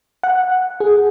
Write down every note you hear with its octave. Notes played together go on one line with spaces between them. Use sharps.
F#5
G#4